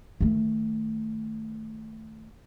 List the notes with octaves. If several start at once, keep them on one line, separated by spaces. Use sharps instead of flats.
D#3 A3